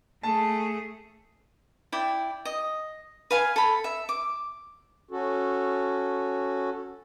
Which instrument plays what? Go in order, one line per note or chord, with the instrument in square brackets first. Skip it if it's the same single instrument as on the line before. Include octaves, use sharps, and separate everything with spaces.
[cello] A3 G#4 [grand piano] A5
[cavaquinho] E4 D5 G5
D#5
B4 F5 G#5
A4 B5
E5
D6
[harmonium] C#4 F#4 A4